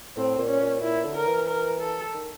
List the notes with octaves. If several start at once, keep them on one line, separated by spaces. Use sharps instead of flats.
A2 C4
A#2
C#4
A#2
A#2 E4
D3
A#4
E3
A#4
A4
D#3